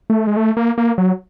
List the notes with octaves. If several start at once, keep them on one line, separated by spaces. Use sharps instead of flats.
A3
G#3
A3
A#3
A#3
F#3